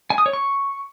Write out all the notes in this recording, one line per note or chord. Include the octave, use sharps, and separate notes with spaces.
G#5
D#6
C#5
C#6